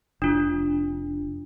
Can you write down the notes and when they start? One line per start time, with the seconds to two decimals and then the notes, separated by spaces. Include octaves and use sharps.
0.22 F1 D4 F4